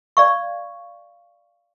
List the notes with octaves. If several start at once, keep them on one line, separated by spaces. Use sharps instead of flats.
D5 F5 C#6